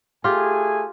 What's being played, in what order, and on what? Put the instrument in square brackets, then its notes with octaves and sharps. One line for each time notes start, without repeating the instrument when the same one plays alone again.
[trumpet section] A3 G#4 G#5 [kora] F4 G4